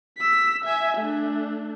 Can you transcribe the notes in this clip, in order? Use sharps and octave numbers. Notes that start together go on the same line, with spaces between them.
E6 B6
E5 G#5
A3 D4